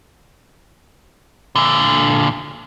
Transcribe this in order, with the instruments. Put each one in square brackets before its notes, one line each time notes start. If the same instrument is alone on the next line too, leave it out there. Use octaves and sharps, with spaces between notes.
[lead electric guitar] A#2 D3